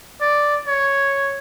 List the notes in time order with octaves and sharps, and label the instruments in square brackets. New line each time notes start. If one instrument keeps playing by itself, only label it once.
[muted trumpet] D5
C#5